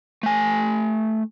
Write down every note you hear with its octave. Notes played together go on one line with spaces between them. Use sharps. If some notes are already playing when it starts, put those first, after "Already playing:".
A3 G#5